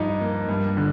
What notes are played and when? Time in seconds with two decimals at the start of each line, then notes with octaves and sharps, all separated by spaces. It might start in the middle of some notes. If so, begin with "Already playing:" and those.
Already playing: G2 F3 D#4
0.21 A#3
0.49 G2
0.77 D3